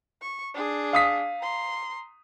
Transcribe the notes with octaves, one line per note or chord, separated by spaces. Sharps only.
C#6
D4 G#4
F5 D#6 B6
A#5 C6